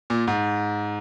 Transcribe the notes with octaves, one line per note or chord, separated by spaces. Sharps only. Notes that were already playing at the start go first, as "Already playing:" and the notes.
A#2
G#2